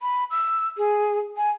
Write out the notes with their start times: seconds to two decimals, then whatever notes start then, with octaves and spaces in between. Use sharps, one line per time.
0.02 B5
0.31 E6
0.78 G#4
1.37 G#5